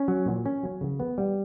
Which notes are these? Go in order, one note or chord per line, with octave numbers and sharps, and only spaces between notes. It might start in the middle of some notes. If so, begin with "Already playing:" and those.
Already playing: C#4
F#3
A#2
C#4
F#3
C#3
B3
G3